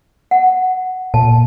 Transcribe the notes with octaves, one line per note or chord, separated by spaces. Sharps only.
F#5
A#2 A5